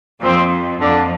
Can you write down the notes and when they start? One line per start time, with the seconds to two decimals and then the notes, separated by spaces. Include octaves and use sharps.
0.21 F2 A#2 F3 C4
0.81 F2 D3 A#3 D4